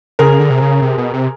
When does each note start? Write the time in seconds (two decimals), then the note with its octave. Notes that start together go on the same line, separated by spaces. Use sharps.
0.19 C#3 G#4 A#4
0.39 D3
0.50 C3
0.61 C#3
0.82 C3
0.98 B2
1.13 C3